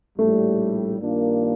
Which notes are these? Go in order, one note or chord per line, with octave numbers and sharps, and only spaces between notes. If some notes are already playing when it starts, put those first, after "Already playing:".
A#1 A2 G3 A3
G2 D#3 A#3 D4 F4